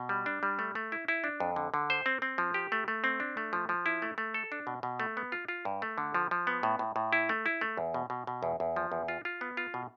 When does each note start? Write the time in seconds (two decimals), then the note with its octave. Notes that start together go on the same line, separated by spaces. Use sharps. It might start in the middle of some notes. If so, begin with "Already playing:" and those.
Already playing: B2
0.09 G3
0.26 D4
0.43 G3
0.59 A3
0.75 A3
0.92 E4
1.08 E4
1.24 D4
1.40 F2
1.56 D3
1.74 D3
1.90 C5
2.06 C4
2.22 C4
2.38 F3
2.54 G4
2.72 A3
2.88 A3
3.04 C4
3.20 D4
3.37 A3
3.53 F3
3.69 F3
3.86 E4
4.02 A3
4.18 A3
4.34 A4
4.52 D4
4.67 B2
4.83 B2
5.00 A3
5.17 B3
5.32 F4
5.48 F4
5.65 G2
5.82 A3
5.98 D3
6.15 F3
6.31 F3
6.47 B3
6.63 A2
6.79 A2
6.96 A2
7.13 E4
7.29 A3
7.46 E4
7.61 A3
7.77 E2
7.94 B2
8.10 B2
8.27 B2
8.43 E2
8.60 E2
8.76 F3
8.92 E2
9.08 F4
9.25 F4
9.41 B3
9.57 F4
9.74 B2